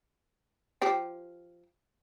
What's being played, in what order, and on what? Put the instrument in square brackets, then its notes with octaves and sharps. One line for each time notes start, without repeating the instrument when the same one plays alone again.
[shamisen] F3 G4 G5